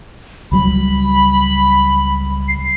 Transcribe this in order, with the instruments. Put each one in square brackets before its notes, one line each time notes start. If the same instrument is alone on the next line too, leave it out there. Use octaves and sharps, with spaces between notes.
[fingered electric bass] C#2 F#3 G3 [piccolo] B5
[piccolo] C7